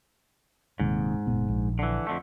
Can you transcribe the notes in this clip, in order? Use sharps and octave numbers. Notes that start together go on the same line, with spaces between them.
D#1 D#2 G#2 C3
F#1 A#2 B3
A#1
D3 E3
F2 D3 A3